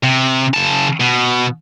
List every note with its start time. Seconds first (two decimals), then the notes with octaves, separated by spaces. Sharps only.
0.04 C3
0.54 C#3 A5
1.00 B2